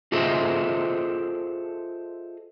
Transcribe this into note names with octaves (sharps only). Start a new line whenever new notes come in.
F4 G#4 A4 C5 D#5 E5